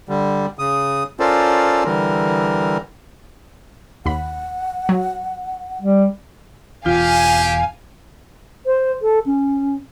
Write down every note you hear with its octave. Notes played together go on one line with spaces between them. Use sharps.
D3 G3
C#3 D#6
C#4 F4 A4 A#4 C5 D5
D3 E3 G3 A#4
D#2 F#5 B5
F#3
G3
E1 E2 F4 G4 F5 G#5
C5
A4
C#4